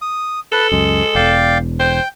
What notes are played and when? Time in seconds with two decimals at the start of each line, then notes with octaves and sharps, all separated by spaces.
0.02 D#6
0.52 A4 B4 A5
0.72 C#2 F#2 G#3
1.15 E1 E2 D5 F5 G5
1.80 C5 G5